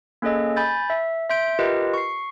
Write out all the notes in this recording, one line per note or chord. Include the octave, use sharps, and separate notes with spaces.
A#3 C#4 G#4 A4 D#5
G#5 B5 G6 A6
E5
E5 C6 G6 D7
F4 G4 A#4 B4 D#5
C#6 C7